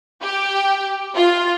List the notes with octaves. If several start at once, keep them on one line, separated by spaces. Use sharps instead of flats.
G4
F4